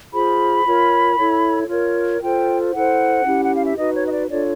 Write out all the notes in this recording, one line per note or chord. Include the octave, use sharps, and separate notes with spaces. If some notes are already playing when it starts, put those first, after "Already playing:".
F4 G#4 C5 B5
F4 A#4 C#5
E4 A4 C#5
F4 A#4 C#5
F4 A4 C5 G5
E4 A4 C5 F#5
C#4 E4 G4
F#5
F5
E5
D#4 F#4 B4 D#5
C#5
D#5
D5
D4 F4 A4 C#5 D5